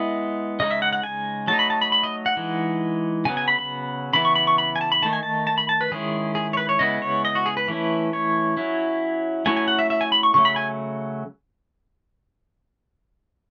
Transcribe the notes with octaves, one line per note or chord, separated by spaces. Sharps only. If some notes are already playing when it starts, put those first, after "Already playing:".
Already playing: G#3 B3 E4 D#5
C#3 G#3 D#4 D#5
E5
F#5
F#5
G#5
F#3 A3 D#4 A5
B5
A5
B5
B5
D#5
F#5
E3 G#3 D#4
C#3 F#3 B3 G#5
G#5
B5
B5
C#3 E3 B3 E4 B5
C#6
B5
C#6
B5
G#5
A5
B5
D#3 A3 D#4 A5
G#5
A5
A5
B5
A5
B4
D#3 G#3 C#4 E4 G#4
G#4
C#5
B4
C#5
C#3 G#3 B3 E4 D#5
C#5
D#5
F#4
G#4
B4
E3 A3 C#4 E4
C#5
F#3 C#4 E4
F#3 A3 C#4 E4 G#5
G#5
F#5
E5
E5
G#5
B5
C#6
C#3 F#3 A3 C#6
B5
G#5